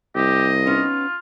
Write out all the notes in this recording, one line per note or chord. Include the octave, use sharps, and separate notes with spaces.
C2 G4 D#5
B3 C#4 D#4 F4